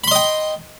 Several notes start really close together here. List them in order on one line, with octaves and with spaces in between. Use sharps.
B5 C6 D#5 G5